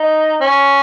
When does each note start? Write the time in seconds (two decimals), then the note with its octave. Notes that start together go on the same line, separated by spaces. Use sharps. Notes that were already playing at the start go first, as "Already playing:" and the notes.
Already playing: D#4
0.41 C#4